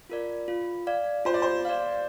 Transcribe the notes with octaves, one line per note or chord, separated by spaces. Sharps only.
F4 A#4 D5
F4
D5 F5
F4 C5
D5
C5
D5 F5